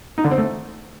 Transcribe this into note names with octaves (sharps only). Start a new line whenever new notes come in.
D#4
D3
C4
A3